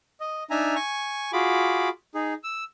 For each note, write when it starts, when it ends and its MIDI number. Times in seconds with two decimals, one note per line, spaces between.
0.20 0.44 75
0.50 0.75 62
0.50 0.75 63
0.50 0.75 76
0.50 0.75 80
0.50 0.75 82
0.76 1.31 80
0.76 1.31 85
1.33 1.89 65
1.33 1.89 66
1.33 1.89 68
1.33 1.89 83
1.33 1.89 86
2.15 2.34 63
2.15 2.34 68
2.44 2.64 88